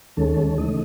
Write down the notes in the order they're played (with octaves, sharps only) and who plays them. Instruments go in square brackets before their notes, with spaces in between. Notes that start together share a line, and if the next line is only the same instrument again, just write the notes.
[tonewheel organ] D#2 D#3 G#3 C#4 A4
C#3 E3 A3 D#5